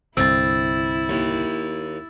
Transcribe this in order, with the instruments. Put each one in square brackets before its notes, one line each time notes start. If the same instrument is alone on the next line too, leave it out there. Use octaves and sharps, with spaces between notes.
[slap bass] C2 G2 D3 [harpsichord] C4 [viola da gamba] E4 [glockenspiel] E6 A6
[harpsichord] D#2